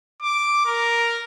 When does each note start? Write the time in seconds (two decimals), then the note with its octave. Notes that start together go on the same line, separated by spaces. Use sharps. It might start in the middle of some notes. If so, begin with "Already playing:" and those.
0.22 D6
0.66 A#4